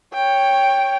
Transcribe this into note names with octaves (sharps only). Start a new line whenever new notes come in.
C#5 G5